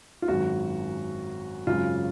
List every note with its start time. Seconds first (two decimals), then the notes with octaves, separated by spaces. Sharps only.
0.22 F4
0.28 G#1 F#2 D#3 F#4
1.67 G#1 F#2 C#3 F4